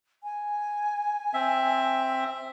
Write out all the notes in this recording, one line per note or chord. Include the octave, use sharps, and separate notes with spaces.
G#5
C4 E5